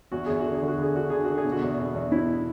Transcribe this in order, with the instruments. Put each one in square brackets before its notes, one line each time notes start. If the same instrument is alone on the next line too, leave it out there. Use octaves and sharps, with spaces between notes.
[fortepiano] E2 F#4
E2 G#4
F#4
D3
G#4
D3
F#4
D3 G#4
D3 F#4
D3 G#4
D3 F#4
G#4
B2
F#4
E2
B2
E2
B2 E4